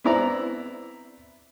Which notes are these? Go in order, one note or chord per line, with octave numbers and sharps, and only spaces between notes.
B3 C4 E4 D5 A#5